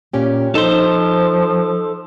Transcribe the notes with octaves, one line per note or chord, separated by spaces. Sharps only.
A#2 C#4 G4
F3 D#4 A4 C5